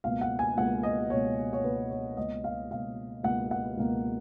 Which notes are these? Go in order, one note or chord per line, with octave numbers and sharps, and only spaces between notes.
C#2 B2 A#3 F5
F#5
G#5
C#2 B2 A#3 F#5
D#5
C#2 B2 A#3 C#5
C#5
C#2 B2 A#3 B4
C#5
C#2 B2 A#3 D#5
F5
C#2 B2 A#3 F5
C#2 B2 A#3 F#5
F#5
C#2 B2 A#3